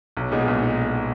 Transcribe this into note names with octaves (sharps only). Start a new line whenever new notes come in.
B1
A#2 G#3 B3 D#4
B1
D#4